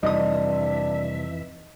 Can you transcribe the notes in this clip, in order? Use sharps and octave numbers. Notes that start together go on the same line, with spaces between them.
F2 C3 E3 G3 D4 D#4 E5 D#6